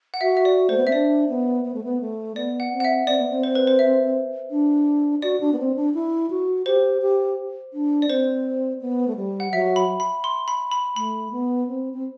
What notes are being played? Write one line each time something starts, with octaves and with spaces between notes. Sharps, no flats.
F#5
F#4 E5
E5
D5
A3 C5
B3
C4 E5
D4 D5
B3
B3
A3
B3
A3
B3 D5
F#5
C4
F#5
E5
C4 D5
B3
C4
C5
B4
C5
E5
D4
F#4 D5
D4
B3
C4
D4
E4
F#4
G4 C5
G4
D4
D5
C4 C5
B3
A3
G3
F#5
F#3 E5
B5
B5
C6
B5
B5
A3 B5
B3
C4
C4